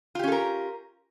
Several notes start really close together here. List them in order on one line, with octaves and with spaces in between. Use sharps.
F4 G4 C#4 A4 A#4